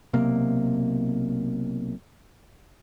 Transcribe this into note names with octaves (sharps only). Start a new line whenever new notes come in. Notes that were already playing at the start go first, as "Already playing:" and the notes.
B1 C3 A#3